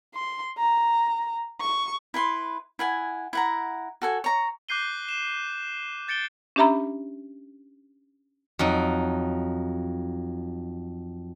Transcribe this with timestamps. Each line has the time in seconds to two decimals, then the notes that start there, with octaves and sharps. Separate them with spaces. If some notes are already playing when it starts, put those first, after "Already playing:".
0.15 C6
0.58 A#5
1.61 C#6
2.14 E4 B4 C6
2.79 E4 F#5 G#5
3.33 E4 F#5 A#5
4.02 F#4 A4 G#5
4.24 C#5 A#5
4.69 D6 F#6 G6 C7 D#7 G7
5.09 E7
6.08 G6 A6 C#7 D7 G7
6.56 C#4 D4 G4 E5 A#5 B5
8.59 F2 F#3 D#4